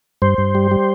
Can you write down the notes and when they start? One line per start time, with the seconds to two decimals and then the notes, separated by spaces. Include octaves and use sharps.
0.22 G2 C5
0.38 G2
0.55 G3
0.71 G3